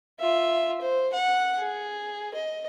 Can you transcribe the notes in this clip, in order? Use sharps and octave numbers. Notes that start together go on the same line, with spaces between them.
F4 E5
C5
F#5
G#4
D#5